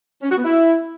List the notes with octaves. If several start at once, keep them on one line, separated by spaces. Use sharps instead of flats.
C#4
F#4
B3
E4